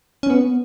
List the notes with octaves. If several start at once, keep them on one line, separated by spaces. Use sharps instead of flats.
C#4
B3